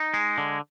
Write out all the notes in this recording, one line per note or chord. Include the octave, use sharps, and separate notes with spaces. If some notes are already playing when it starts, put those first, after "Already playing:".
Already playing: D#4
G#3
D3